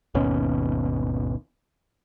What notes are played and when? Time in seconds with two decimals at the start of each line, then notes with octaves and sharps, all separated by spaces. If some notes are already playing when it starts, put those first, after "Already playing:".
0.14 G#1 D#2 B2 C#4